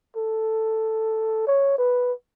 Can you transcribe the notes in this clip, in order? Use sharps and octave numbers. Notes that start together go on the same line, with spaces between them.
A4
C#5
B4